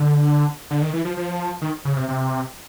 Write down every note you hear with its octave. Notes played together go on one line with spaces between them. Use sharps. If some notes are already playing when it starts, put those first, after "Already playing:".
Already playing: D3
D3
D#3
E3
F3
F3
D#3
C#3
C3
C3